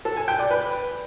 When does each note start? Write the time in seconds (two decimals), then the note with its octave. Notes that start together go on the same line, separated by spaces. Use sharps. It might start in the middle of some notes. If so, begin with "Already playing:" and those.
0.05 A4
0.17 G#5
0.28 G5
0.39 D5
0.51 B4